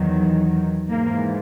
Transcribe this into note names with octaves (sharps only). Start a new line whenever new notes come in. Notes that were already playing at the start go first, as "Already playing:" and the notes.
Already playing: E2 D#3 F#3
G#2 E3 A#3